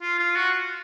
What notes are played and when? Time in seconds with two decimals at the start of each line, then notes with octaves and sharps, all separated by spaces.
0.02 F4
0.19 F4
0.36 F#4